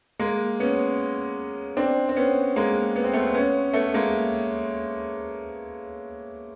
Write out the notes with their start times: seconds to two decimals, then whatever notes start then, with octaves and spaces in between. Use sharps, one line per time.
0.19 G#3 A#3
0.60 B3 C#4
1.77 C4 D4
2.09 C4
2.16 B3 C#4
2.56 G#3 A#3
2.96 B3
3.04 C4
3.14 A3 B3
3.34 B3 C#4
3.73 A3 B3
3.94 G#3 A#3